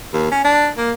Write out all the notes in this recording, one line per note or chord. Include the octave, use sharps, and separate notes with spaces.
D#2
C#4
D4
A#3